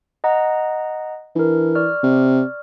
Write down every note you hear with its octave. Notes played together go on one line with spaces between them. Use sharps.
D#5 F#5 A#5
E3 D4 A#4
D5 C#6 F6
C3